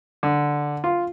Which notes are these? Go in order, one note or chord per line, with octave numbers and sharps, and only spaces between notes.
D3
F4